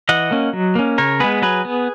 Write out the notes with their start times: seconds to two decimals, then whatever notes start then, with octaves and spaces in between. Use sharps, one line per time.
0.09 E3 D#5 F#5
0.31 A#3 C#4
0.53 F#3
0.75 A#3 C#4
0.98 C#3 A#4 C#5
1.20 G#3 B3 G#4 B4
1.42 F#3 G#4 B4
1.65 B3